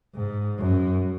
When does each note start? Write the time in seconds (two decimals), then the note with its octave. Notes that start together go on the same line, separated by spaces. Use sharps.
0.15 G#2
0.59 F#2